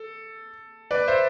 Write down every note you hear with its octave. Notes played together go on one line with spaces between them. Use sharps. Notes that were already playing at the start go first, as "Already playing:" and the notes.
Already playing: A4
B4 D5
C5 E5